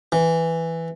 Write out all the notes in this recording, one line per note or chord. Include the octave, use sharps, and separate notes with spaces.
E3